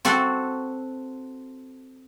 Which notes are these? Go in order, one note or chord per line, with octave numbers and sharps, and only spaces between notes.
C4 F#4 A4 F#5